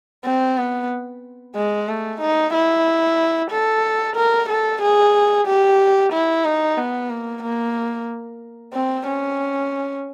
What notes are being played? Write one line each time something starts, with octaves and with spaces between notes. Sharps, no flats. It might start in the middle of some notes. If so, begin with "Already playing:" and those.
C4
B3
G#3
A3
D#4
E4
A4
A#4
A4
G#4
G4
E4
D#4
B3
A#3
A#3
C4
C#4